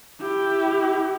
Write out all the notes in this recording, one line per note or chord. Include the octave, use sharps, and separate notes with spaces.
E4 G4